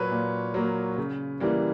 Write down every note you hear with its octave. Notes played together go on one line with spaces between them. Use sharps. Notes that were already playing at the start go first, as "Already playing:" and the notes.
Already playing: A#2 F#3 A#3 B4 C#5
A#2
F#3 A#3
C#3
E3 G3 A#3